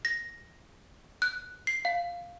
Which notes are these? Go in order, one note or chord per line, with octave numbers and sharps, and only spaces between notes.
A#6
F#6
C7
F5